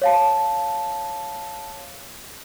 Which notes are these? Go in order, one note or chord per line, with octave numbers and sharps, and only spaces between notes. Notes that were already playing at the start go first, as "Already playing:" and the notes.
C#5 F5 A5